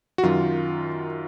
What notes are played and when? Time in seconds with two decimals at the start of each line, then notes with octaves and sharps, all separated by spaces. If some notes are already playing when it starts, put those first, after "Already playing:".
0.18 F#4
0.23 F#2 D#3 F#3 F4